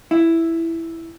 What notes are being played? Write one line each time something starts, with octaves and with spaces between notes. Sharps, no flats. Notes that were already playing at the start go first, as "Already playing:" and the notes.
E4